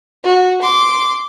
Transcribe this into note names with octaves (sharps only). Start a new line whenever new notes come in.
F#4
C6 D6